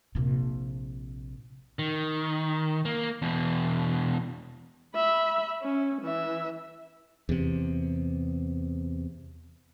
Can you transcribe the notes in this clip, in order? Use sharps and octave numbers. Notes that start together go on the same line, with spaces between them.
A#1 C3
D#3
A#3
E2 B2
E5 B5
C#4
E3 E5
E2 C3